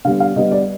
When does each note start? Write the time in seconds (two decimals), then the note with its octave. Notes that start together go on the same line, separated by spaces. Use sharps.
0.05 D3 G3 B3 F5
0.20 F5
0.36 D3 G3 B3 D#5
0.51 D5